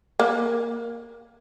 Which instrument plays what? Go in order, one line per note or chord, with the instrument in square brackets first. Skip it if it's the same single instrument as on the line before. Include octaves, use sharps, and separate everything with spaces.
[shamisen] A#3